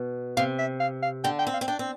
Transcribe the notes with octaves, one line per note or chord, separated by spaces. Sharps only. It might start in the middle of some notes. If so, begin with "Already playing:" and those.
Already playing: B2
C3 F5
E5
F5
F5
D3 G5
G5
C4
F5
C4
D4 G5
C4